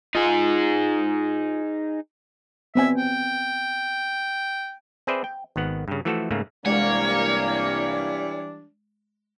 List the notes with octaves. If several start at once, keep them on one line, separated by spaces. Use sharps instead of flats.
D#4 F4 G#4
B3 C4 E5 G#5
G5
C4 G#4 B4 C5 D5 E5
G5
G#1 D#3 B3 F#5
G2 C#3
E3 F3 A3 F#4 A4
G#2 C#3 A3 A#3
C2 E3 G3 G#3 A#3 D4 C#5 D5